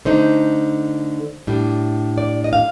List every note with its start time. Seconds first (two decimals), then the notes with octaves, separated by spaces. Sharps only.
0.05 D3 A3 D#4 C5
1.47 A2 G3 D4
2.18 D5
2.44 D#5
2.53 F5